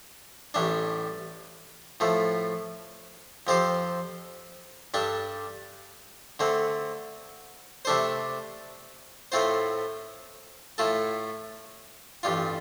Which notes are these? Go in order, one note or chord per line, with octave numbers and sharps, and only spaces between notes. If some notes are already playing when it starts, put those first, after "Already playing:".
A1 A2 G3 D4
A2 F3 A3
F2 F3 C4 G4 C5
G2 G3 D4 A4
D3 A3 C4
C3 A3 D4 A4 C5
A2 A3 C4 F4 C5
A2 A3 F4 A4
A1 G2 G3 F4